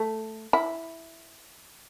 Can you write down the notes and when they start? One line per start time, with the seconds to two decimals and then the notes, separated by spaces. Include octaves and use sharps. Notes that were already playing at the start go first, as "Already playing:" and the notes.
Already playing: A3
0.53 E4